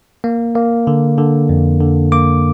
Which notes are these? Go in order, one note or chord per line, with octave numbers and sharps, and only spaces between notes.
A#3
A#3
D3
D3
F2
D3
A#3 D6